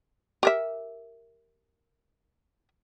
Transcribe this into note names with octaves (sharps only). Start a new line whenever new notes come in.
G4 A#4 E5